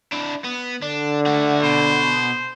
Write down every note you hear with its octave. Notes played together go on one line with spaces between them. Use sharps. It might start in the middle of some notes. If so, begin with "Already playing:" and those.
D4 E4
B3
D3 D4
A3 F#4
B2 C5